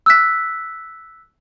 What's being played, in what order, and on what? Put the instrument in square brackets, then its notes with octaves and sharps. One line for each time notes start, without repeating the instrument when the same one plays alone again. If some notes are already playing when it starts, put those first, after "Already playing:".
[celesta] E6 F#6 B6